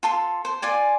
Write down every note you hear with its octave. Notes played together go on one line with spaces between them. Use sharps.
F4 A4 C6
C5
F4 D5 G#5